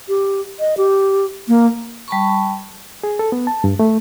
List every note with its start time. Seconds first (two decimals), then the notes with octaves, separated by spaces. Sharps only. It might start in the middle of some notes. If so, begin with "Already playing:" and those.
0.08 G4
0.59 D#5
0.77 G4
1.48 A#3
2.08 G3 A5 B5 C#6
3.04 G#4
3.19 A4
3.32 B3
3.47 A5
3.64 G2
3.79 A3